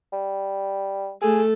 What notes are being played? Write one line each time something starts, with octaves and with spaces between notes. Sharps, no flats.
G3
A3 G#4 A4